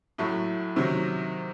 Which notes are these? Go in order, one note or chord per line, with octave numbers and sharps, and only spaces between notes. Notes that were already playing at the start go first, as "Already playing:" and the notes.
A2 F#3 A3
C3 D#3 F#3